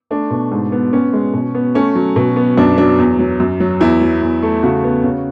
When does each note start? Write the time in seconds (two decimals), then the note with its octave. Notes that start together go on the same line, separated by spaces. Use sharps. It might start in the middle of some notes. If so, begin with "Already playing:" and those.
0.11 A3 D4
0.31 B2
0.51 G#2
0.72 B3
0.93 B3 C#4
1.13 G#3
1.34 B2
1.55 B3
1.75 A3 C#4
1.95 F#3
2.16 B2
2.36 B3
2.57 F#2 D4
2.78 F#3 D4
2.98 E2
3.19 F#3
3.40 F#2
3.60 F#3
3.80 E2 E4
4.01 F#3
4.22 E2
4.43 A3
4.63 C#3 F#4
4.84 B3
5.04 C#3